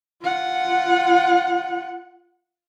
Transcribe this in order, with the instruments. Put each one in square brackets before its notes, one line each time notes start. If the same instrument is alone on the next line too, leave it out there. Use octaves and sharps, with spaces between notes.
[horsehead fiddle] F4 F#5